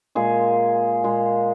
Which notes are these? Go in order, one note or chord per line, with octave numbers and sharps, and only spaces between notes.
A#2 G#3 G#4
A#2 G#3